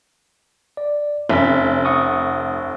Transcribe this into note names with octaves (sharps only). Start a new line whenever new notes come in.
D5
F1 C#4 B6
F#5 C#6 D#6